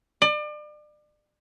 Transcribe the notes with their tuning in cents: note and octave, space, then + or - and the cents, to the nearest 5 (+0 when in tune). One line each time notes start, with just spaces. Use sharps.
D5 +35